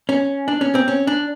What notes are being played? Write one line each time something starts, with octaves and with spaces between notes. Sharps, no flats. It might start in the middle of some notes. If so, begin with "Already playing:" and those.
C#4
D4
C#4
C4
C#4
D4